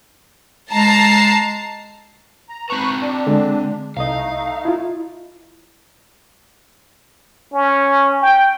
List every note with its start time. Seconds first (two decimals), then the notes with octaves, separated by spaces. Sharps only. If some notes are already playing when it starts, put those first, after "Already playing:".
0.73 G#3 A5 A#5 C7
2.49 A#5
2.70 C4 B4 A5 A#5 C#6 F#6
3.01 D4
3.27 D3 G#3
3.97 C2 A3 D#4 D#5 F5
4.65 E4 F4
7.53 C#4
8.22 G5